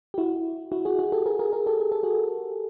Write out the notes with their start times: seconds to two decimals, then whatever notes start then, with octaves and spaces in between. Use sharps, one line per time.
0.14 G4
0.18 E4 F#4
0.72 E4 F#4
0.85 F#4 G#4
0.99 F#4 G#4
1.12 G4 A4
1.26 G#4 A#4
1.39 G#4 A#4
1.53 G#4 A#4
1.66 G4 A4
1.80 G#4
1.92 A4
2.03 F#4 G#4